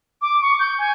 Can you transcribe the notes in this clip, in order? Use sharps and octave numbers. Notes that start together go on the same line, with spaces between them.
D6
C#6
G6
G#5